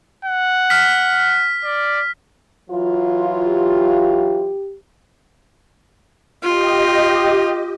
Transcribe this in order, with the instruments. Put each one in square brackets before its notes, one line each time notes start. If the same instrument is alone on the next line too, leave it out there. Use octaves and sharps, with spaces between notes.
[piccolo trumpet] F#5
[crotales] F6 B6
[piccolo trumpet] D5
[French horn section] E3 F#3 F4
[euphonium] G4
[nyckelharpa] F4 [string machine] G4 D#5